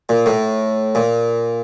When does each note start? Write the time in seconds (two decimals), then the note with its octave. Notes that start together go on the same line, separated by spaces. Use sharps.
0.09 A#2
0.26 A2
0.95 A#2